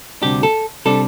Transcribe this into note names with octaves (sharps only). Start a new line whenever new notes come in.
D2 C3 G3 D4 G4
A4
C3 G3 D4 A4